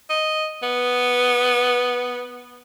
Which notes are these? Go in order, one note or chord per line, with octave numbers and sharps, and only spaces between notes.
D#5
B3